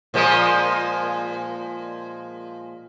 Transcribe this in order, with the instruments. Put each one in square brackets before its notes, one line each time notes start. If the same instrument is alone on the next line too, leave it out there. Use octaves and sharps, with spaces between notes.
[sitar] A#2 F3 G#3